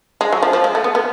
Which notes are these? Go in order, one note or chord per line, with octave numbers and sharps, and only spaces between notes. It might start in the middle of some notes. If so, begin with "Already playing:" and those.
G#3
F#3
F3
F3
G#3
A3
B3
B3